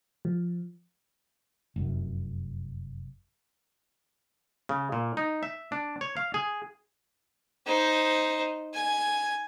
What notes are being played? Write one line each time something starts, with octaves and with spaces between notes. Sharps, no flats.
F3
F1 F#2
C#3
A#2
D#4
E5
D4
C#5
F5
G#4
D#4 C5
G#5